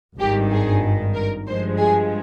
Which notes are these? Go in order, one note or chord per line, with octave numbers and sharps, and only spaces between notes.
G#1 G2 D#3 G4
G#4
A#4
G2 F3 G#3 C5
G#4